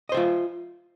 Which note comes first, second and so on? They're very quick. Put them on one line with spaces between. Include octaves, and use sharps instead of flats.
D#5 C5 E5 F4